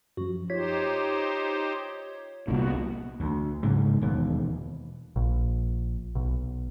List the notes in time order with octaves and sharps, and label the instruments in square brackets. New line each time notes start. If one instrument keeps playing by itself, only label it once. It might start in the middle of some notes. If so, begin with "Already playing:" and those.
[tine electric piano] F#2 F3 [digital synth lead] F#4
[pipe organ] D#4 G4 C5 [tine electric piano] F4 C#5 B6 [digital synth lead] G#6
[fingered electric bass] C2 A#2 [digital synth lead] A#3 [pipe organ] B3 F#4
[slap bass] D2
G#2 C#3 F#3
E1 D#2 B2
[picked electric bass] A#1
B1